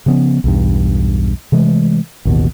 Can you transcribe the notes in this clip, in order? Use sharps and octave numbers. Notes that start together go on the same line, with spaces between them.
C#3 F3 B3 C#4
B1 E2 G2
C3 E3 G#3 A3
A1 D#2 B2